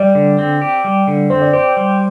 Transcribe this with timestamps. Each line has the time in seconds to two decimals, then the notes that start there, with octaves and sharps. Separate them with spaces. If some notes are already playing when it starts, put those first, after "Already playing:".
Already playing: G3 D5
0.15 D3
0.38 C4
0.62 G4
0.84 G3
1.07 D3
1.30 C4 C5
1.42 D5
1.53 G4 C5
1.77 G3